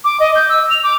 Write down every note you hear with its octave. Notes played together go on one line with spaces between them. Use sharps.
D6
D#5
G6
E6
F7
D6